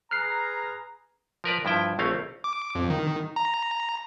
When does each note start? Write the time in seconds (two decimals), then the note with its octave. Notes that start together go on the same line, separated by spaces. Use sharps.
0.11 G#4 B4 A#5 F6 F#6 C7
1.44 F3 A#4 B4 D5
1.65 G2 F3 E4 G5
1.99 A#1 A3 C4 C#4 F5
2.44 D6
2.75 F2
2.90 D#3
3.36 A#5